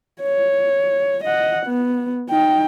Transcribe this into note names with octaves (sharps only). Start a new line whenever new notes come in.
C#5
D#5 F#5
B3
D#4 G5